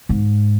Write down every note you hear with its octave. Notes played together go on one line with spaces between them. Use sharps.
G#2